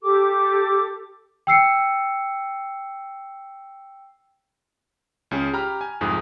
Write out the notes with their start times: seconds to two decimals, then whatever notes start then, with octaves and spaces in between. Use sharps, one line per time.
0.02 G4 A4 D6
1.47 G5 E6 C7 C#7
5.31 C#2 C#4 G#4
5.53 G4 A#5 B5 F6
5.81 G#5
6.01 C2 F2 G#2 G#4 D#6